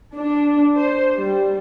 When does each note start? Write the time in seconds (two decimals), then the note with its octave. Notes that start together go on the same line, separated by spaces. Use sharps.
0.16 D4
0.77 C5
1.16 G3